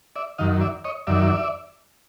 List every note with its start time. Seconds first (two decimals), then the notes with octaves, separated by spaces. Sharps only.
0.16 D5 E5
0.38 F#2 D#3 D#5 F5
0.61 D5 E5
0.84 C#5 D#5
1.07 F#2 D#3 D5 E5